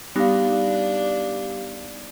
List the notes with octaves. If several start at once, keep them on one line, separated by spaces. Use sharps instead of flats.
G3 B3 D4 D#4 G4 F5